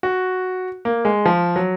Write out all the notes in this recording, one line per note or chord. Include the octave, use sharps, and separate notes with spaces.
F#4
A#3
G#3
F3
F#3